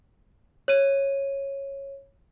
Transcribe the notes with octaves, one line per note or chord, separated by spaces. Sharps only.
C#5 D#7